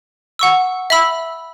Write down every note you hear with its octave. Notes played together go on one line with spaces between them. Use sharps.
F#5 C#6 E6
E5 B5 E6